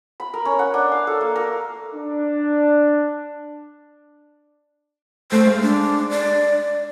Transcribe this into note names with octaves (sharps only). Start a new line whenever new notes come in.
B5
A#4
C#4
F#5
D4
F5
A4
A#3
A#4
D4
A3 C5
G#3 F5
D4
D5